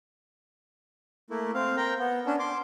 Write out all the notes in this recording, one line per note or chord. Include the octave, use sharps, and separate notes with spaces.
A3 A#3 E4
C4 F5
A#4 G5 A#5
B3
C#4 D4
C6 D6